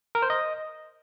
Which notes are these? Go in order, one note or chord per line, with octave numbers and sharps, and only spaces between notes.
A#4
C5
D#5